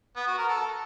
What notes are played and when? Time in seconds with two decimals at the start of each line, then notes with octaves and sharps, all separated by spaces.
0.16 B3
0.27 F#4
0.38 A#4
0.49 A4